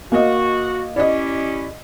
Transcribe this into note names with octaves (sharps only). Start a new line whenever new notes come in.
A#3 F#4 D#5
C#4 E4 G4 D5 D#5